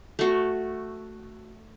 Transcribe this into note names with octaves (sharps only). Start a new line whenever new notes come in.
A3 F#4